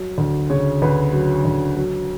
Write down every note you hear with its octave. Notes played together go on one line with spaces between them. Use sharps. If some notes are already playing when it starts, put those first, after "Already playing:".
Already playing: F#3
D2
C#3 C#5
D2 B4
F#3
D2
F#3